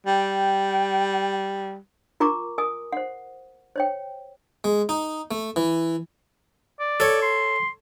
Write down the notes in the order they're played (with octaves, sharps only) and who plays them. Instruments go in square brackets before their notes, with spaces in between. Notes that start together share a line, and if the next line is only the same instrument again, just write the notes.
[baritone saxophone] G3 [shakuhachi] G5
[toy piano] F4 A#4 A#5 C#6 D6
A#4 G#5 D#6
C5 F#5
C5 C#5 G5
[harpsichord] G#3
D#4
A3
E3
[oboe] D5
[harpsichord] A4 C#5
[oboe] C6